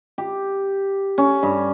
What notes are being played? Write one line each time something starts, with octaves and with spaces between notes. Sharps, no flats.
G4
C#4
G2